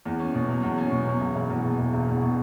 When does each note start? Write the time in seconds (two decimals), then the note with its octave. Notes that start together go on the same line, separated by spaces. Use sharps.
0.05 E2
0.20 C#4
0.35 B2
0.49 F#3
0.63 E2
0.78 C#4
0.92 B2
1.07 F#3
1.21 E1
1.36 E1
1.50 E2
1.64 B2
1.79 E1
1.93 E1
2.08 E2
2.22 B2